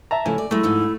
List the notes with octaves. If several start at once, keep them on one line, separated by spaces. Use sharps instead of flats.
E5 A5 A#5
C#3 F3 A3 E4 G#5
D5
F#3 G#3 A3 E4
G#2 F3 D#4